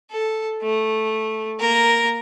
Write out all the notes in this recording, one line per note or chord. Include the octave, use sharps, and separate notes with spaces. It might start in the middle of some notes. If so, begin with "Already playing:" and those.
A4
A3
A#3 A#4